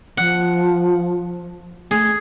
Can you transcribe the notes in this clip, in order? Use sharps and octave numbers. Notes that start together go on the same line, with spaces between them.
F3 F#5
A3 G#4